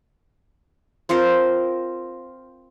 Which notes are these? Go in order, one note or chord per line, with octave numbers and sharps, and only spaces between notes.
C4 F4 A#4 C5